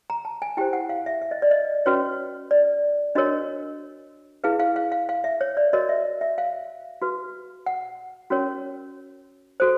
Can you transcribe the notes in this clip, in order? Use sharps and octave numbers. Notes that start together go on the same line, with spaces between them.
A#5
A5
G#5
E4 G4 C5 G5
F#5
F5
E5
E5
D#5
D5
D#5
C#4 F#4 B4 C#5
D5
D4 F#4 A#4 C#5 D#5
E4 G#4 B4 F5
F5
F5
F5
F5
E5
C#5
D5
F#4 A#4 C#5 D#5
E5
E5
F5
F#4 B4
F#5
C#4 F#4 A#4 C#5
F#4 A4 C5